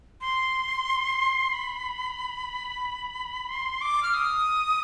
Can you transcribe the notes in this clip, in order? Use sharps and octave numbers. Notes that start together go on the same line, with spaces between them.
C6
B5
C6
D6
F6
D#6